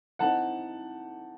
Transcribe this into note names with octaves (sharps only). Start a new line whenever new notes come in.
E3 C4 D#4 F#5 A5